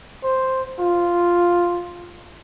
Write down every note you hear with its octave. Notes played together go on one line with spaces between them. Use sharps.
C5
F4